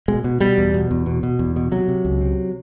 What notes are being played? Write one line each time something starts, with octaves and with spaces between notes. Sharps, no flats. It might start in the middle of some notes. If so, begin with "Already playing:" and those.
B2 G#3
B2
B2 G3
E2
B2
E2
B2
B2
E2
B2
C3 F#3
C3
C#2
C3